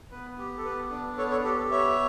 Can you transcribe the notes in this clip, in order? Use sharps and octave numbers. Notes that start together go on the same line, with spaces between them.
B3 B4
G4
A4
B3 B4
D4
B3 A4 C#5
A4 C#5
G4 A4
A4
B3 C#5 E5